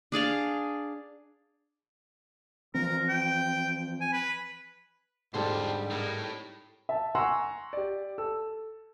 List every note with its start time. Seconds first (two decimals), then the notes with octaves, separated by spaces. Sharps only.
0.12 D4 G#4 D5 F5
2.74 E3 F3 C4 A#4
3.09 G5
4.01 G#5
4.13 B4
5.34 G#2 D3 G3 C4 D4 A4 C5
5.91 A2 D#4 E4 A#4
6.89 E5 A5
7.15 F#5 G#5 A#5 C6 C#6 E6
7.73 G4 D5
8.18 A4 E6